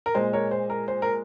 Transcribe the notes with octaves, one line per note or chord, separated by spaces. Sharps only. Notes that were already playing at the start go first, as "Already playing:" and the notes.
A#4
A#2 G#3 C5
A#4 C#5
C5
A#4
C5
A#4